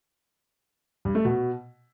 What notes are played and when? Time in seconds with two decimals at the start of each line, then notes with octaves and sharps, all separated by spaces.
1.05 G2
1.15 A3
1.25 B2